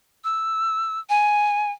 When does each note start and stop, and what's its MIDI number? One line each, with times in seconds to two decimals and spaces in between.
0.24 1.00 88
1.09 1.71 80